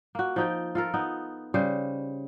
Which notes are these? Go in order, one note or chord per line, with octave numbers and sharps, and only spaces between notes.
A#3 F#4
F3 D#4 G5
F4 A4 A#4
B3 D#4
C#3 G3 C5